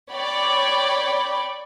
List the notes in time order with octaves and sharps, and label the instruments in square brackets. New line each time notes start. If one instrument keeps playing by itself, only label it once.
[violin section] C#5 D5 G5 B5 D6